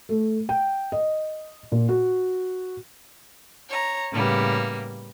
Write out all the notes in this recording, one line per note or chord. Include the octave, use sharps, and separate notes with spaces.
A3
G5
D#5
A#2
F#4
C#5 A#5
A2 C#3 G3 A#3 B3